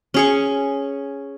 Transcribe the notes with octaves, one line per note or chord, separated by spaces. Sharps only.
C#4 G#4 C#6